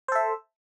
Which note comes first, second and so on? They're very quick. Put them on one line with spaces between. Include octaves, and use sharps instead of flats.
C5 A4 E5